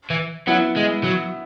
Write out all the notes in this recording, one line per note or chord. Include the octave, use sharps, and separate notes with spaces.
E3
F#3 B3 E4
G#3
F#3